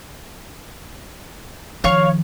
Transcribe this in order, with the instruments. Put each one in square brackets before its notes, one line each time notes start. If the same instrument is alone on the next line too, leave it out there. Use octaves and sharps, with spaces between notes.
[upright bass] D#3 F3 [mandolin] C#5 F5 C#6